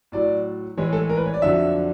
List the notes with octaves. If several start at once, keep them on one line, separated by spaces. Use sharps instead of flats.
A2 F#3 D5
A2 E3 G#3 C#5
A4
A#4
B4
C#5
D5
F2 D3 F#3 E5